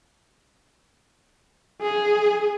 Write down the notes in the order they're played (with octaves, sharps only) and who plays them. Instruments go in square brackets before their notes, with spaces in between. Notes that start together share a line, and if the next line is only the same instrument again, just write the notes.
[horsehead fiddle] G#4